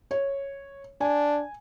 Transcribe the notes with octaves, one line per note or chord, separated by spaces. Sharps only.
C#5
D4 G#5